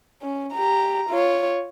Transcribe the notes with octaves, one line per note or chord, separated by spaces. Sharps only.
C#4
G4 A#5
F4 C#5